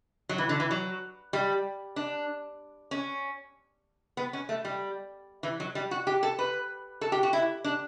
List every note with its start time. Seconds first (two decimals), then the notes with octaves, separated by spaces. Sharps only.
0.29 F#3
0.38 E3
0.49 D3
0.60 E3
0.71 F#3
1.33 G3
1.96 D4
2.91 C#4
4.17 B3
4.33 C#4
4.49 A3
4.65 G3
5.43 E3
5.60 F#3
5.75 G3
5.91 F#4
6.07 G4
6.23 A4
6.39 B4
7.01 A4
7.12 G4
7.23 F#4
7.33 E4
7.64 D4